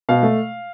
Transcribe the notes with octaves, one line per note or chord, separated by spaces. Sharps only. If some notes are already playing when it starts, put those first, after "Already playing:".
B2 F5
A3